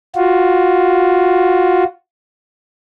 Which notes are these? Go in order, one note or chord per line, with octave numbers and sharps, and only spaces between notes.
F4 F#4